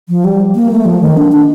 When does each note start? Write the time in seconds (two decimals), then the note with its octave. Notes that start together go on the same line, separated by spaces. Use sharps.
0.09 F3
0.24 G3
0.55 A#3
0.71 A3
0.85 F3
1.01 D#3
1.17 D4
1.32 D4